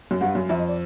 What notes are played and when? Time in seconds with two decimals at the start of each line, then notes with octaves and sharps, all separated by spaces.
0.11 F#2
0.21 G2 F#5
0.35 F#2
0.49 F2 E5
0.59 D#5
0.68 D5